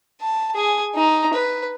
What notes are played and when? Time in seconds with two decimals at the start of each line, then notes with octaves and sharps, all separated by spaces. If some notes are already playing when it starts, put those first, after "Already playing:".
0.21 A5
0.54 G#4 G#5
0.95 D#4 A#5
1.33 B4